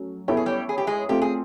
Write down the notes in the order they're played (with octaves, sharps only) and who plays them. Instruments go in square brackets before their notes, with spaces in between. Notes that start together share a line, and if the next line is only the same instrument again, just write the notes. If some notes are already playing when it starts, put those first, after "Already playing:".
Already playing: [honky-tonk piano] F#3 A3 C#4
[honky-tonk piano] B3 E4 A4 C#5 [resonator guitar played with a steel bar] G4
[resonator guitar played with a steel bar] G#4
G3 G4
G#4
G4
G#3 G#4
[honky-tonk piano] A3 C4 F4 [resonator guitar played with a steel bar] G4
[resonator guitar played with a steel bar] G#4